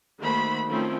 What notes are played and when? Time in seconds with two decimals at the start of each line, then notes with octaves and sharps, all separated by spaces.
0.21 D#3 A3 A#3 F#4 C5 B5
0.68 D#3 F3 A3 C4 C#4 G5